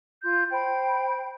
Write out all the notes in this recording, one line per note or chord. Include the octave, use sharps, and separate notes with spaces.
F4 C6 G6
C5 G5 B5